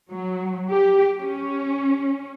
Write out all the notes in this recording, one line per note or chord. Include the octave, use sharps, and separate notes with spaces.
F#3
G4
C#4